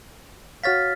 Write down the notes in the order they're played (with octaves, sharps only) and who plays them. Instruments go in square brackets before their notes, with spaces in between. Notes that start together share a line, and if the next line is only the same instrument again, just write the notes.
[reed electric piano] F#4 C#5 F5 [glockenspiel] F6 A6 B6